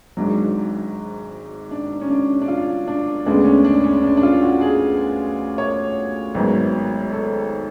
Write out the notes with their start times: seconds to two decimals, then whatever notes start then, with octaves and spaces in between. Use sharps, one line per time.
0.17 G#1 G#2 F#3 D4
1.71 D4
2.02 C#4
2.10 D4
2.41 D4
2.48 F4
2.88 D4
3.26 D2 C#3 G#3 B3 D4
3.45 C#4
3.64 D4
3.84 C#4
4.03 D4
4.17 D4
4.23 F4
4.42 F#4
4.61 G#4
5.58 C#5
6.35 G#1 G#2 F#3 B3
7.12 A4